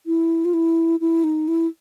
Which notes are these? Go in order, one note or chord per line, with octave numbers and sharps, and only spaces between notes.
E4
F4
E4
E4
D#4
E4